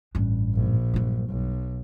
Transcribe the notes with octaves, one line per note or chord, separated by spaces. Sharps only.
A1 G2
A#1
G2 F#3
B1